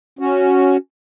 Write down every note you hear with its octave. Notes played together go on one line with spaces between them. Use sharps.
C#4 F#4